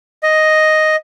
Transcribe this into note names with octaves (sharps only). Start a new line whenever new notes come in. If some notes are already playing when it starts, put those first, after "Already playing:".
D#5